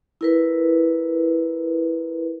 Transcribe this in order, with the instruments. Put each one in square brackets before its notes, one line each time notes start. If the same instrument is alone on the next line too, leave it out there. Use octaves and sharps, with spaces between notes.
[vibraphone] E4 A#4 B4